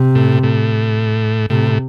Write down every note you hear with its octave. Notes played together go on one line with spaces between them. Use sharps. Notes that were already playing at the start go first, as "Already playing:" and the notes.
Already playing: C3
A2
A2
A2 C3